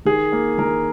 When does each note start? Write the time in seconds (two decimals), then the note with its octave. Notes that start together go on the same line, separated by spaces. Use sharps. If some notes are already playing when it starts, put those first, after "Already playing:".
0.05 D#3 G#4
0.32 A#3
0.58 D#3 A#4